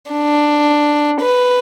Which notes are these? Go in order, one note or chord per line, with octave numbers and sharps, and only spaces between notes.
D4
B4